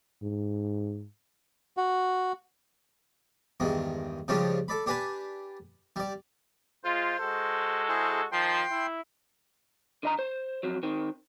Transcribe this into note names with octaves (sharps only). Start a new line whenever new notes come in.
G#2
F#4
E2 G2 D#3 G#3
C#3 F3 G3 G#3 C#4 D4
A4 D5 B5
D4 G4 B4 G#5 A5 B5
G3 D5
G#3 F4 C5
G#3 F#4 A4
E4 G#4 C5
D#3 F3 G5 C6
E4
D3 D#5 A#5
C5
F2 F#3
D#3 C4